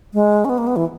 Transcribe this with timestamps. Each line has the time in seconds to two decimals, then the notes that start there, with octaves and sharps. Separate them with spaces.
0.14 G#3
0.45 C#4
0.49 B3
0.58 A#3
0.67 B3
0.76 E3